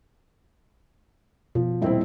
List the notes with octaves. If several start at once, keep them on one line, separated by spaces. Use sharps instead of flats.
B2 F3
D#1 C4 E4 G4 D#5 E5